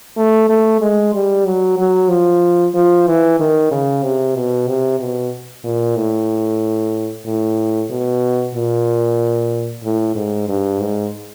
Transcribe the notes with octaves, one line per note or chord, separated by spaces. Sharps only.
A3
A3
G#3
G3
F#3
F#3
F3
F3
E3
D#3
C#3
C3
B2
C3
B2
A#2
A2
A2
B2
A#2
A2
G#2
G2
G#2